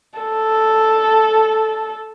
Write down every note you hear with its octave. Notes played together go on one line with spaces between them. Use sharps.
A4